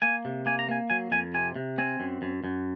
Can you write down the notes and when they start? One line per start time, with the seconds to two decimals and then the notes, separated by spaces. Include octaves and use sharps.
0.02 A#3 G#5
0.25 C3
0.46 A#3 G#5
0.59 A#5
0.69 A#3 G#5
0.90 F#3 G#5
1.12 F2 G#5
1.34 C3 G#5
1.56 C3
1.78 C4 G#5
2.00 F#2
2.22 F#2
2.44 F#2